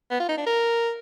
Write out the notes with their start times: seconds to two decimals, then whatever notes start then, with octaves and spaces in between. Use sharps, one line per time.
0.11 B3
0.20 F4
0.29 D#4
0.38 D4
0.47 A#4